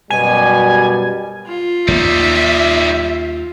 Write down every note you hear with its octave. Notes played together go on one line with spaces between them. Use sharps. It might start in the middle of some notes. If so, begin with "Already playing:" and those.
F#2 B2 G3 G#5
F4
D#2 D#3 F3 G3 E5